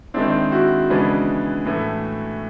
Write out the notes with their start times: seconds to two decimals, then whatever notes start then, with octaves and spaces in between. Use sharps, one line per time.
0.14 D#3 G#3 C4 D4 E4
0.52 E4 F#4
0.90 C#3 E3 G#3 B3 D4
1.65 A2 E3 A3